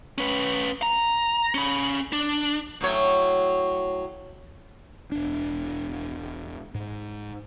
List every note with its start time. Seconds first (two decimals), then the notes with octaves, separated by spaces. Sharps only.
0.18 C#4 B4
0.82 A#5
1.55 C#4 B5
2.13 D4
2.81 A2 F#3 C#5
5.12 E1 D4
6.75 G#2